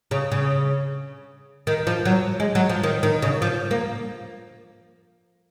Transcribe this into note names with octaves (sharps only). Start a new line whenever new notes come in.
C#3
C#3
D#3
F3
F#3
G#3
F#3
F3
D#3
D#3
C#3
F3
A#3